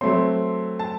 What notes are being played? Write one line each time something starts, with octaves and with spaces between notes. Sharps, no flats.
F#3 A3 C4 C6
A5